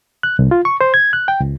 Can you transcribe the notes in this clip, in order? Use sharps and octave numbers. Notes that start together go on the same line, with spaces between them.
F#6
C2
F4
C#6
C5
G#6
F#6
G5
C#2